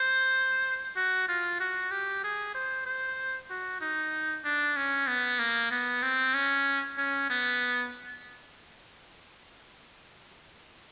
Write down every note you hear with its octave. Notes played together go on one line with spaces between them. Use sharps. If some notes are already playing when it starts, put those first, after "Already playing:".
Already playing: C5
F#4
F4
F#4
G4
G#4
C5
C5
F#4
D#4
D4
C#4
B3
A#3
B3
C4
C#4
C#4
B3